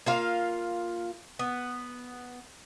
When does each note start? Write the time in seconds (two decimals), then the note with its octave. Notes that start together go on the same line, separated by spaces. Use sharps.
0.06 A#3 F4 F5
1.39 B3